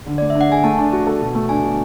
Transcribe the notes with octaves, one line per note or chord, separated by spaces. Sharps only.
D3
A3 D5
E5
D4
F#5
G#4 G#5
A3 A5
D4
F#4 A5
A4
B2
A3
D4 G#5
B2